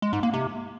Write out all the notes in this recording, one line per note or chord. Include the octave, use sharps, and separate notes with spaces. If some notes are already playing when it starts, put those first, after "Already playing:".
G#3
G#2
A#3
C3